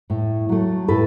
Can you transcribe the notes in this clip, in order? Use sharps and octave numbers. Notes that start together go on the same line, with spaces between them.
A2
F#3 A3
A2 A4 B4